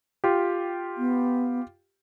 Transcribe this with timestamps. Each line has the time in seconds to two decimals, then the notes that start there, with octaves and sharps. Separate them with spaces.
0.24 F4 G4
0.98 B3